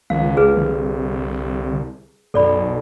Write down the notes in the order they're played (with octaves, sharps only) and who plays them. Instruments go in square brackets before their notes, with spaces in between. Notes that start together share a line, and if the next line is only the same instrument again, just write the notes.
[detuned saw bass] C#2 [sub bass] D#3 [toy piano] F5
[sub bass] F1 [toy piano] G#4 B4
[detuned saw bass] C2 [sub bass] D3
[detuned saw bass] B1 [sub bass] F#2 [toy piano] A4 D5 B5